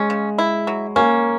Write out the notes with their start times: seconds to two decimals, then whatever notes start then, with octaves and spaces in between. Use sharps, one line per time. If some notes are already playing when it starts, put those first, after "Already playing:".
Already playing: G#3 C#4
0.10 C#3
0.38 E4
0.67 F#3
0.96 A#3 C#4